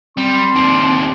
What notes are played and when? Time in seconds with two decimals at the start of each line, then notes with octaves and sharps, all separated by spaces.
0.17 G3 C4 C6
0.55 D#2 D4